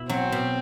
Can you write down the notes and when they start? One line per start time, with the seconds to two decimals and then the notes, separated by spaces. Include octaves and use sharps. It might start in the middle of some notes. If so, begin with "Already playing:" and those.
Already playing: B2 E4
0.09 F#3 C4
0.32 B2